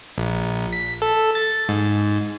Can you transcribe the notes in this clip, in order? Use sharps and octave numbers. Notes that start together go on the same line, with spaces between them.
A#1
B6
A4
A6
G#2